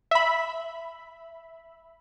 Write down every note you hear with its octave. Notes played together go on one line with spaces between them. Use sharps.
E5 B5